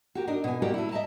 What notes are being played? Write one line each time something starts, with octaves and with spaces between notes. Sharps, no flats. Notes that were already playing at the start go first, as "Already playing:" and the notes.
F#4 G4 A#4
D4 D#4 A#4
B2 G#5
A#3 F#4 G4 A#4 D5 F#5
A3 E4
D#5 E5 F#5 A5 A#5